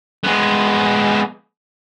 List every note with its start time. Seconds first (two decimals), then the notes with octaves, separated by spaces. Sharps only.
0.24 G#3 B3